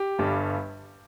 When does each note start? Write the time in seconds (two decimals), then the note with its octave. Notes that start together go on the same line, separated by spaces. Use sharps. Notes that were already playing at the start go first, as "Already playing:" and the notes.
Already playing: G4
0.19 G1 G2 G3